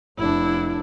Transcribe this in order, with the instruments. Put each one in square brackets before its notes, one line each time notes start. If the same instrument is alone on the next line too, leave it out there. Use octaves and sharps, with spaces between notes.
[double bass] F1 D4 [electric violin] E4